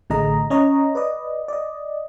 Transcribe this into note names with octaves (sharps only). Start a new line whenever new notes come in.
A1 D3 A3 G#4 D#5 A#5
C#4 C#5 D#5 A#5
B4 D5 D#5
D5 D#5